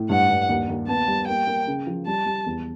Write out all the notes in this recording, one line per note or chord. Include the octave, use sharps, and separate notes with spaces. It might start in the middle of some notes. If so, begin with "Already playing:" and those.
Already playing: A2
G2 F#5
G2
D#2
D#2
B3 A5
G3
A#3 G5
A#3
C#3
F3
G3 A5
G3
E2